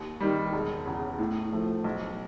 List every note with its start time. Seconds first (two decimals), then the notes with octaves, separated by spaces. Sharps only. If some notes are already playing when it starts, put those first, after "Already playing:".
Already playing: D#2
0.20 D#3 G3
0.53 E1
0.86 E2 C#3
1.19 A2
1.52 F3 A3
1.84 B1